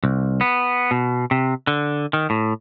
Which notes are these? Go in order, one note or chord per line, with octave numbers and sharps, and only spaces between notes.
C2
B3
B2
C3
D3
D#3
A2